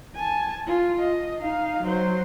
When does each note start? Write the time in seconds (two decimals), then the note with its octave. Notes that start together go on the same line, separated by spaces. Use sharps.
0.16 G#5 A5
0.67 F4
1.00 D#5
1.40 D#4 F5
1.84 F#3 C5